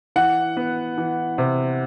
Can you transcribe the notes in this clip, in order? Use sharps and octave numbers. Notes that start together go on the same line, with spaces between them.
E3 F#5
B3
E3
C3